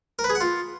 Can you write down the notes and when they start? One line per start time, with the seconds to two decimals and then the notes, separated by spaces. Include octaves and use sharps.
0.19 A#4
0.24 B4
0.30 G#4
0.35 F#5
0.41 F4